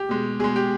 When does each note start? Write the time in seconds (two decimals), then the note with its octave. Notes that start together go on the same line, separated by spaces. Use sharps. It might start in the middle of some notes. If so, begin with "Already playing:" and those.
Already playing: G4
0.09 B2 G#3
0.39 B2 G#3 G#4
0.56 G4